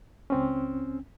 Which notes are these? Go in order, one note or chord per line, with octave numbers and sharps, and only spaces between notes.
C#2 C4 C#4